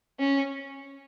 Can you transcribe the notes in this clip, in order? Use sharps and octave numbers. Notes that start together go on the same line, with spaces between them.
C#4